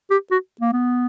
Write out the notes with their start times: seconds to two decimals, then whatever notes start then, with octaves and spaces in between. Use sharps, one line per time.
0.11 G4
0.31 F#4
0.61 A#3
0.73 B3